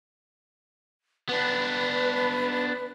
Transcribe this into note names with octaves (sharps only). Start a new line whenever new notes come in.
B3 D4 B4